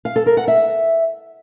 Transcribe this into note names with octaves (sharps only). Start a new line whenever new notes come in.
F5
A4
A#4
F#5
E5